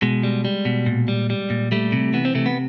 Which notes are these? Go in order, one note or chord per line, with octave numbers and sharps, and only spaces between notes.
B2 G#3
G3
G3
B2
A#2
G3
G3
A#2
G3 A3
C3
E3 B3
C4
C3 A3
B3